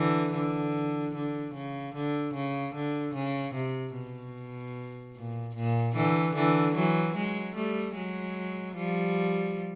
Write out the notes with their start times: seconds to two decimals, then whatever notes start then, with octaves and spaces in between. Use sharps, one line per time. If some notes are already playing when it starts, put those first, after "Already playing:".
Already playing: D3 E3
0.34 D3
1.15 D3
1.54 C#3
1.94 D3
2.34 C#3
2.74 D3
3.14 C#3
3.54 C3
3.94 B2
5.15 A#2
5.55 A#2
5.95 D3 E3
6.35 D3 E3
6.75 E3 F#3
7.15 F#3 G#3
7.55 G3 A3
7.95 F#3 G#3
8.76 F3 G3